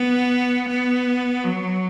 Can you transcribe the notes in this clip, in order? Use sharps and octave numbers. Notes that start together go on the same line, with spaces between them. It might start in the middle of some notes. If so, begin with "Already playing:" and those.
Already playing: B3
B3
F#3